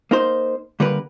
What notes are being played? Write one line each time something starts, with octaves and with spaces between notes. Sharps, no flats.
A#3 D#4 C5
D3 G3 A#3 A#4 B4